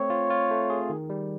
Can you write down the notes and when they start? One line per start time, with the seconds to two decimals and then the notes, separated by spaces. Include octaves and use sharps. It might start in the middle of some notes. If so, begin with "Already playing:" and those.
Already playing: A3 C4 C#5
0.10 F4
0.30 F4
0.51 A3
0.70 G#4
0.90 D#3
1.10 G3